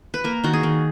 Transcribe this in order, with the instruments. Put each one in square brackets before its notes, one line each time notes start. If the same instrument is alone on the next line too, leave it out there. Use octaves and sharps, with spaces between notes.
[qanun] B4
A#3 A#4
D#3 F#4
G#4
D#3